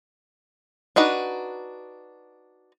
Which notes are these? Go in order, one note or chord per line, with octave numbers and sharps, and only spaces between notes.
D4 D#4 F#4 B4